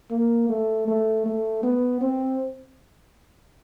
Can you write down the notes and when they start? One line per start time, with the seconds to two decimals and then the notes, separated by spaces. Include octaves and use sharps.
0.11 A#3
0.49 A3
0.87 A3
1.25 A3
1.63 B3
2.01 C4